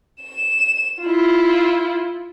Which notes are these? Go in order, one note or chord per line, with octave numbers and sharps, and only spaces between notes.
E7
E4 F4